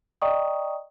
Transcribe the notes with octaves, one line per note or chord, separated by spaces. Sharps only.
D5 D#5 G5 A#5 C#6 D#6